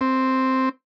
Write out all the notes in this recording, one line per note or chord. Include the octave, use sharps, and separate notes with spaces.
C4